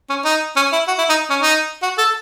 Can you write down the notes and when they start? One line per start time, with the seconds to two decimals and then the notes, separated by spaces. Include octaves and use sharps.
0.09 C#4
0.25 D#4
0.56 C#4
0.72 E4
0.88 F#4
0.98 E4
1.09 D#4
1.30 C#4
1.41 D#4
1.83 F#4
1.98 A4